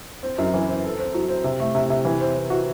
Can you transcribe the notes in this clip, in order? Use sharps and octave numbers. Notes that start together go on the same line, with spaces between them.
C4
F#2
E3
C4
A4
C4
F#3
C4
C3
A3
C3
C3
E3
C4
C4
F#4